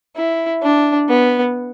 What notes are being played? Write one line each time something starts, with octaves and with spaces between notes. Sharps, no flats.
E4
D4
B3